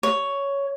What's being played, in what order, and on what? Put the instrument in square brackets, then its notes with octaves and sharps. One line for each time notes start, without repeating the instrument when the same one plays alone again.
[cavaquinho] C#5